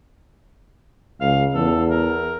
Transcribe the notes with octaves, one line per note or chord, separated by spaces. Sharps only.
C#2 F5
E2 A4
A#4